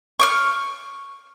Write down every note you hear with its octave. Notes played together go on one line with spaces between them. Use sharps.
C#6 D6 F6